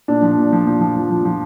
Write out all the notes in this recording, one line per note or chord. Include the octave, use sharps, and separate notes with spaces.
A#2 D4
F3
A#2
F3
F3
F3
F3
F3
F3